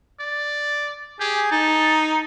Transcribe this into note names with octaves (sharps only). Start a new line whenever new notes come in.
D5
G4 G#4
D#4 A5